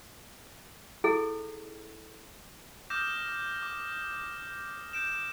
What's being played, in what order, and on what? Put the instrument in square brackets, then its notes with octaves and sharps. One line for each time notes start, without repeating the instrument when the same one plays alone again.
[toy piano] E4 G#4 A4
[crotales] D6 D#6 F6 G6 A#6 E7
D6
G6 D7 E7